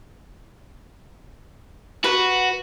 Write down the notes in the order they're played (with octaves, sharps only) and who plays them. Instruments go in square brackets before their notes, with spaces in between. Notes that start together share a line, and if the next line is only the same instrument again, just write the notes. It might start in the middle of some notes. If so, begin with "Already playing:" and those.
[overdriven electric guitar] F#4 [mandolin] B4